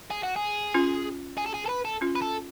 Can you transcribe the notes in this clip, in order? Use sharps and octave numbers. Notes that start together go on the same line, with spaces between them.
G#4
F#4
G#4
C#4 F4
G#4
A4
G#4
A4
B4
A4
C#4 F4
B4
A4